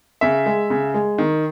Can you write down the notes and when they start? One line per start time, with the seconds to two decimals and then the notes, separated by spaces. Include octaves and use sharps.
0.21 C#3 E5
0.46 G#3
0.70 C#3
0.94 G#3
1.18 D#3